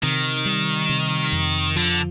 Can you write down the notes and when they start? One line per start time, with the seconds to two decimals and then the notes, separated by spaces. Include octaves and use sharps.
0.03 C3 D#3
0.45 G3
0.89 C3
1.32 F2
1.76 D3 F3